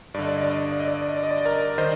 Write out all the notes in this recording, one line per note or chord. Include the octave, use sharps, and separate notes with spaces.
G2 D3 D5 D#5
D5
D#5
D5
D#5
D5
D#5
D5
D#5
D5
D#5
D5
D#5
D5
D#5
D5
D#5
A#4 D5
D#3 C5 D#5